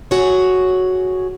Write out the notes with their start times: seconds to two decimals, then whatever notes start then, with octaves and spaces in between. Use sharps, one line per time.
0.11 F#4 G#4 C#5